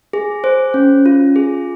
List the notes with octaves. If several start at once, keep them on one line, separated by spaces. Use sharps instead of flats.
G#4
C5
C#4
F4
G#4